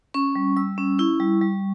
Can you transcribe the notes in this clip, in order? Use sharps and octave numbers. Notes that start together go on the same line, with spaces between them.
C#4 C#6
G3
G3 E6
C#4
E4 C#6
G3
G3